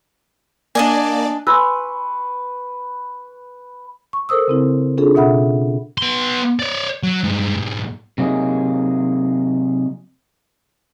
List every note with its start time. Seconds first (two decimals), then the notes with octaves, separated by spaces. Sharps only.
0.75 A#3 D4 D5 D#5 G#5
1.47 B4 G#5 C6 C#6 E6
4.13 C#6
4.29 A4 A#4 C5 D#6 E6
4.48 C#3 C4 E4
4.98 C#4 D4 F4 G#4 A4
5.15 B2 E5 F#5 B5
5.98 B3 C6
6.59 C#5 D5
7.03 F#3
7.24 G2 G#3
7.55 B1 G#2
8.18 C3 F#3 A#3 D#4 G#4